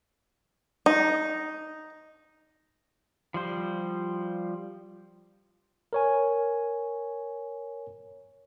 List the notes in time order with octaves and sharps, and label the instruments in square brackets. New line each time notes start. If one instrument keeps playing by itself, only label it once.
[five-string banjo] D#4
[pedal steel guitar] F3 G3 C5
[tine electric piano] A#4 C#5 G#5